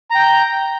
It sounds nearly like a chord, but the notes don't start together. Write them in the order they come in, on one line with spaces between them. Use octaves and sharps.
A#5 G5 G6